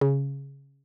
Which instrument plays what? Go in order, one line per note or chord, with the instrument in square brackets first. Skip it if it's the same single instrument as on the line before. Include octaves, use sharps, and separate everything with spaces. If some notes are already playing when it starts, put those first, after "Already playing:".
[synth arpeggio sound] C#3